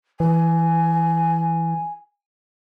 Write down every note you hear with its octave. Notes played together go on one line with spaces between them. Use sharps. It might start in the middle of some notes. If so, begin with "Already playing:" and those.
E3 G#5